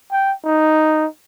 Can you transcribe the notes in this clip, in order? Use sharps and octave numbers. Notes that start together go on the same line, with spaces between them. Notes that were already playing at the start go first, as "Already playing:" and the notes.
G5
D#4